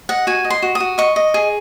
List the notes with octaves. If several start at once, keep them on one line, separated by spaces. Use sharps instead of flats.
D#5 F#5
F#4 G#5
D#5
C6
F#4
D#6
F#4
D#5 C#6
D#5
G#4